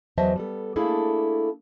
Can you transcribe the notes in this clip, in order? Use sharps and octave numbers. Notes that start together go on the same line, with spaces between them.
E2 F#3 C5 D#5 E5 A5
G3 B3 A4
A3 A#3 D4 E4 G#4 A4